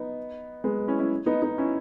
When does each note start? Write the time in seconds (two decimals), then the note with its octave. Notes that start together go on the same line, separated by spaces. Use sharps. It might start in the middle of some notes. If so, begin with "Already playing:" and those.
Already playing: B3 D#4
0.64 G#3 B3
0.87 C#4 E4
0.99 C#4 E4
1.26 B3 D#4
1.42 B3 D#4
1.58 C#4 E4